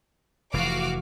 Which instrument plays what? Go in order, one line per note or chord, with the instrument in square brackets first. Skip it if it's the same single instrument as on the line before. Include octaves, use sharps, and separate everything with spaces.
[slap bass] F1 E3 [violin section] F#4 F5 D6